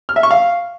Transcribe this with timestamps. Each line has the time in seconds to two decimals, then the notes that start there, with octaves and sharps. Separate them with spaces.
0.09 F6
0.16 E5
0.23 C#6
0.31 F5